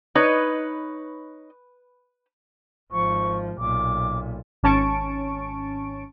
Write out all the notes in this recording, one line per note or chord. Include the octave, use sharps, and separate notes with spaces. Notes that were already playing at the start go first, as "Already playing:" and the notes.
D#4 B4 C#5
G#1 F3 C#6
B1 A#2 D6
G#1 C#4 A5 C#6 D7